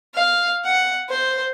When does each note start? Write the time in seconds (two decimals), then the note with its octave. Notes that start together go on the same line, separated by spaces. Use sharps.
0.14 F5
0.65 F#5
1.09 C5